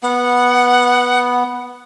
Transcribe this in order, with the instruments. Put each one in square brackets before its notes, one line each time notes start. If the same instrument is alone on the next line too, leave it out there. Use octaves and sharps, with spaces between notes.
[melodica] B3 [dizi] F#5